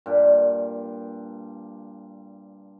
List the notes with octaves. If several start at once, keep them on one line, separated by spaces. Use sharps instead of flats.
G2 A#2 D4 B5